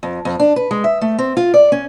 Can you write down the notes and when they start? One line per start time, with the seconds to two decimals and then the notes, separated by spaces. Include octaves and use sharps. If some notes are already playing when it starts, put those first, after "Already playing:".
0.03 F2
0.25 F2
0.40 D4
0.56 B4
0.71 G#3
0.84 E5
1.01 A3
1.18 C4
1.37 F4
1.54 D5
1.72 C#4